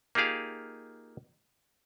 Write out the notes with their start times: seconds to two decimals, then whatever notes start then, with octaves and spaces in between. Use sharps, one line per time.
0.15 A#3 D#4 F4 G4 G#4 F5